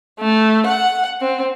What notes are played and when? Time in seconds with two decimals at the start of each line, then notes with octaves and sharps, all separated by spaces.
0.19 A3
0.65 F#5
1.20 C4